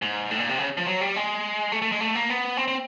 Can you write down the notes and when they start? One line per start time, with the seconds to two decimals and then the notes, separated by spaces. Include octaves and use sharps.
0.02 G#2
0.31 A2
0.39 A#2
0.49 C3
0.59 C#3
0.77 F3
0.87 F#3
1.01 G3
1.16 G#3
1.72 A3
1.82 A3
1.92 G#3
2.00 A3
2.15 A#3
2.30 B3
2.57 C4
2.68 C4